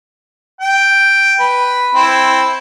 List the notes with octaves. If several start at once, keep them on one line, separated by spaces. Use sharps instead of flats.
G5
B4
C4 E4